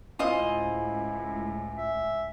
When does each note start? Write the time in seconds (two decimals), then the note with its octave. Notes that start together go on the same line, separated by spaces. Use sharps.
0.19 C#2 A2 E4 F4 C5 D#5 G#5
1.77 E5